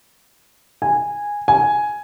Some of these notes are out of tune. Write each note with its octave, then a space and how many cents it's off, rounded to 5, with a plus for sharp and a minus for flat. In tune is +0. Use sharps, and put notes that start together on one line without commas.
G#5 -10
G#5 +5